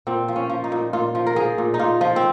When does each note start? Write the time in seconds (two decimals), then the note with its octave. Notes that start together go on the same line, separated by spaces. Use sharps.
0.07 A#2 C4
0.28 F3
0.36 C#4
0.50 F3
0.64 D#4
0.72 A#2
0.93 A#2 F4
1.15 F3
1.27 A#4
1.36 F3 G#4
1.58 A#2
1.74 D#4
1.79 A#2 F4
2.01 F3
2.16 C4